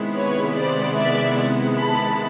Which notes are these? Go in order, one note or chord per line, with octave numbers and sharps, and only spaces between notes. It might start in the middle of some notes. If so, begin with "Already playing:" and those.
Already playing: C3 D#3 G#3 B3 E4
B4 C#5
C5 D5
D5 E5
A5 B5